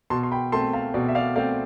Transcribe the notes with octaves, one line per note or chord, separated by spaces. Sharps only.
B2 A5 C6
C6
G5 B5
A3 C4 A5 C6
F5 A5
B2 D5
E5
D5 F5
A3 C4 D5 F5